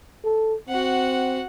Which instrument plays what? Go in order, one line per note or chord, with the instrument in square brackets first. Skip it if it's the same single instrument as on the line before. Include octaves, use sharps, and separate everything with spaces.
[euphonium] A4
[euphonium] C4 [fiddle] F#4 F#5